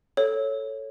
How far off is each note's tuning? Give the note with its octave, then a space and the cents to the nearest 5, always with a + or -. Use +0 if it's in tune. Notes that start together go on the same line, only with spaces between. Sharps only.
A4 +0 C#5 +0